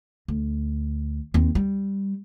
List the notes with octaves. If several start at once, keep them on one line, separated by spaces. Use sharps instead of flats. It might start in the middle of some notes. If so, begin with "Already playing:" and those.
D2
D#2 C4
G3